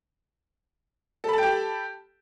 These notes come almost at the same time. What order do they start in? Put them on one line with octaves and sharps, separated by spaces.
A4 B5 A5 G5 G4